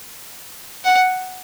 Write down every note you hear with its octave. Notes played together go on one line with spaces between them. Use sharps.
F#5